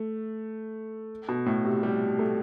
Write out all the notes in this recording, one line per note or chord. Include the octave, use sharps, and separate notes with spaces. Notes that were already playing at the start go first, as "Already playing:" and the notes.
Already playing: A3
B2
A2
C3
G3
A3